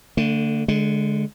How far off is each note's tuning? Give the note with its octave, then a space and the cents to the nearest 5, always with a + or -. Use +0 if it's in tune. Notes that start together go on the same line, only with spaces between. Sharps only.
D3 +0 A3 +40
D3 +0 G#3 +25